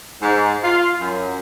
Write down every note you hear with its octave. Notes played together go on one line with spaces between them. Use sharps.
G#2
F4
F#2